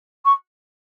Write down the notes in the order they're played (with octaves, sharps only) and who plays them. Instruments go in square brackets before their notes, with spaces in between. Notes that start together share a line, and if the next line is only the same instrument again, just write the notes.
[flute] C#6